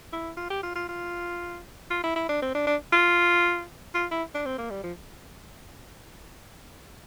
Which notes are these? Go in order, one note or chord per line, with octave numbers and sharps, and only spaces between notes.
E4
F4
G4
F4
F4
F4
F4
E4
E4
D4
C4
D4
D4
F4
F4
E4
D4
C4
A#3
G3
F3